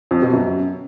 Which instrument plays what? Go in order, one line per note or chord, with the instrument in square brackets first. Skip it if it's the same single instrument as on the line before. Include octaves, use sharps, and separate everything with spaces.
[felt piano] F2
B2
F#2